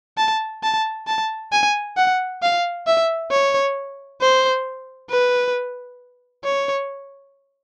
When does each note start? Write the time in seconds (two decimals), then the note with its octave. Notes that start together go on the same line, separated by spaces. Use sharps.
0.18 A5
0.63 A5
1.07 A5
1.53 G#5
1.97 F#5
2.42 F5
2.87 E5
3.31 C#5
4.21 C5
5.10 B4
6.45 C#5